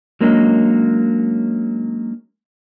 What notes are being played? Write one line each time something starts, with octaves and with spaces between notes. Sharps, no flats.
F#3 G#3 A#3 C#4 D4 D#5